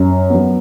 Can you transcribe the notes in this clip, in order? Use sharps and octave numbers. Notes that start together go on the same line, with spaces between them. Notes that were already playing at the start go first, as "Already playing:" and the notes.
Already playing: F#2
F#3 B3